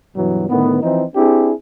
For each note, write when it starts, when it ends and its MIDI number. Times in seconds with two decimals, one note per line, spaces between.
0.16 0.45 43
0.16 0.45 47
0.16 0.45 52
0.16 0.45 54
0.49 0.81 45
0.49 0.81 50
0.49 0.81 51
0.49 0.81 59
0.83 1.04 52
0.83 1.04 53
0.83 1.04 60
0.83 1.04 63
1.16 1.52 60
1.16 1.52 62
1.16 1.52 64
1.16 1.52 67
1.16 1.52 68